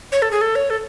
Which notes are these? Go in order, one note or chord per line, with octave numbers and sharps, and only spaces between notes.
C#5
A4
G#4
A4
C#5
A4